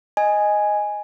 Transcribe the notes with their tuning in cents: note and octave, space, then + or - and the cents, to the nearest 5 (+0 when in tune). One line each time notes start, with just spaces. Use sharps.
D#5 +0 G#5 +0